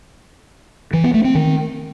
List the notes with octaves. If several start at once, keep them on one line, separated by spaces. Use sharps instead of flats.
E3
B3
A3
C4
D#3